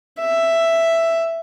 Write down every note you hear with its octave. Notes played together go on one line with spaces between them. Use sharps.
E5